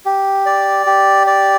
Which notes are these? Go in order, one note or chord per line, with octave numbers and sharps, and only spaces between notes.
G4
D5
G4
D5